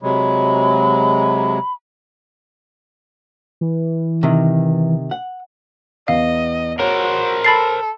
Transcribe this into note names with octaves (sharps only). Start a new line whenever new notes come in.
C3 F#3 G#3 B5
E3
C3 D#3
F#5
E2 B3 D#5 F5
F#4 A#4 C5 C#5
A4 B5 A6 C7